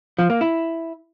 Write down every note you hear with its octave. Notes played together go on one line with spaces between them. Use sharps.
F3
A#3
E4